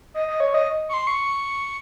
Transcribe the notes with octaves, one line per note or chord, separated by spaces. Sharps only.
D#5
D#5
C#5
D#5
C#6
C6
C#6